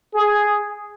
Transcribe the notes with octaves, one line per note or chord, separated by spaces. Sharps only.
G#4